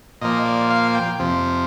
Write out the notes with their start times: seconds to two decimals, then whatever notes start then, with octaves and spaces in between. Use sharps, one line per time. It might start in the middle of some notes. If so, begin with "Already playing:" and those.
0.21 A#2 F3 A#3 D#5
0.45 D5
0.70 F5
0.95 G5
1.19 F2 C3 F3